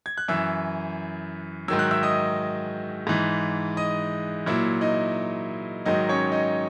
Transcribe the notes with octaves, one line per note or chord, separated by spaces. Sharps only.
G#6
F#6
F#2 E3 E5 E6
G#2 D#3 F#3 E6
F#6
E5 E6
D#5 D#6
G#2 E3
D#5 D#6
A#2 F#3 E4 E5
D#4 D#5
G#2 D#3 F#3 D#4 D#5
C#4 C#5
D#4 D#5